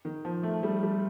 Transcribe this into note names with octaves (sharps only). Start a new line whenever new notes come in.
D#3
F3
A3
G3
G3